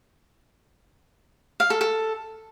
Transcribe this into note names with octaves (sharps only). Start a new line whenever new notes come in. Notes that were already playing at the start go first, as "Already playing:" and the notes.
F5
A4
A4